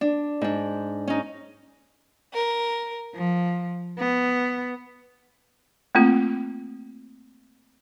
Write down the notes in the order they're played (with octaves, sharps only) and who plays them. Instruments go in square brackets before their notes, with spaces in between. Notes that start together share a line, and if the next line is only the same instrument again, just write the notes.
[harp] D4
G#2 D4
C#4 D#4
[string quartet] A#4
F3
B3
[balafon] A3 A#3 C4 F4